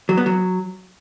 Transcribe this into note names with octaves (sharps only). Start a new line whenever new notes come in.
F#3
B3
F#3